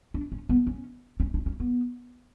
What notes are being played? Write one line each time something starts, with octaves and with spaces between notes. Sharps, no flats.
D4
C#4
B3
C#4
C#4
D4
C#4
B3